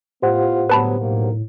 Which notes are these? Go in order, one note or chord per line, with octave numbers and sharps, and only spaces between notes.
A2 A3 B3 F4 G4 C5 F#5
G1 F#3 B3 B4 A5 B5
B1 A#3